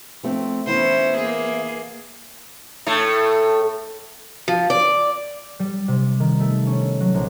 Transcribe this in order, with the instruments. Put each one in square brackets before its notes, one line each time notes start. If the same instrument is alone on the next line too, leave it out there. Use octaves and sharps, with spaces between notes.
[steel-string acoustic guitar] F3 A3 C4
[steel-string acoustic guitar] E3 B3 E4 [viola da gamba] C#4 C5
[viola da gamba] A#3 G#4
[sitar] A2 A3
[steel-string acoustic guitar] F3
D5
[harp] G3
C3
D#3
A3
C#4
F#3
A#1